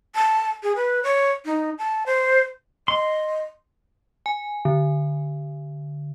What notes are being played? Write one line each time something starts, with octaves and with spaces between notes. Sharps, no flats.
A5
G#4
B4
C#5
D#4
A5
C5
D#5 C6
G#5
D3